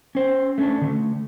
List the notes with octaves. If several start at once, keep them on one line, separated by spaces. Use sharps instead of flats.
C#4 C5
A3 C#4 D4
D3 A3